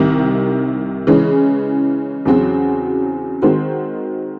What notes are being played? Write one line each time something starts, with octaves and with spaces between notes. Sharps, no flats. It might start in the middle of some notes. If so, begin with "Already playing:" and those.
Already playing: C2 C3 D#3
C#3 E3 G#3 C#4
E2 C#3 F#3 C4 F#4
D#3 G#3 C4 F#4 C5